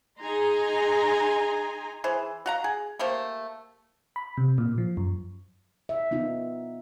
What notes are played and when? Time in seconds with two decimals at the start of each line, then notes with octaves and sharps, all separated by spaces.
0.20 D#4 G#4 G#5 A#5 C6
2.04 E3 G#4 C5
2.46 F#4 F5 A#5
2.64 G#4
2.99 A3 A#3 G4 C5
4.16 B5
4.37 C3
4.58 A#2
4.78 F3
4.97 F#2
5.89 E5
6.11 B3 D#4 F4